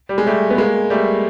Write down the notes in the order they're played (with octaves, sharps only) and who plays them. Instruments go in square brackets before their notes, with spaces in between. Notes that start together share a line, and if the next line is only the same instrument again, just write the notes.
[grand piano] G3
G#3
G3 A3
B3
G#3 A#3
G3 A3